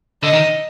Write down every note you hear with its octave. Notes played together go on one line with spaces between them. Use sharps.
D3 D#5
D#3